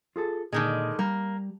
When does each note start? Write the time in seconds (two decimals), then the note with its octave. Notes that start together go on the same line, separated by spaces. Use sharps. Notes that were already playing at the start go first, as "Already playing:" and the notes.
0.16 F4 G#4 A4
0.53 A#2 D3 D#3 G#3
0.99 G3 A#3